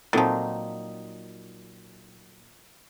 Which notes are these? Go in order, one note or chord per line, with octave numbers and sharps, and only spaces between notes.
A#2 D#3 F3 F#3 C4 D#4 A4 A6